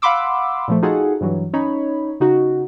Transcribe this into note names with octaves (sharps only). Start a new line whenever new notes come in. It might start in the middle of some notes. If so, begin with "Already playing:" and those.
F5 F#5 B5 C6 D6 E6
A#2 F3 A3
D#4 F4 F#4 G#4 A4 F#5
G2 E3 F#3
C#4 D#4 C#5 B5
C#3 D#4 F#4